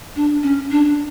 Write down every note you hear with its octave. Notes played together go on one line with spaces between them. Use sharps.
D4
C#4
D4